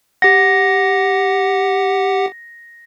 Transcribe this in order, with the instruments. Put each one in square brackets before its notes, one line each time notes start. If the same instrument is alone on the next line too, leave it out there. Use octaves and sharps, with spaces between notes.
[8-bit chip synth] G4 F#5 [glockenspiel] A#6